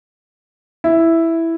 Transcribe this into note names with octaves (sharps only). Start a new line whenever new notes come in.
E4